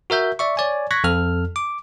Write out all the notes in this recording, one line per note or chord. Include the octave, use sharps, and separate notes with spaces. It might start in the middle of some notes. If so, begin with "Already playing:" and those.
F#4 A#4 E5 G6
D5 E5 C#6
C#5 D5 G#5
C#6 F#6 G#6 A#6 B6
F2 A4 F6
D6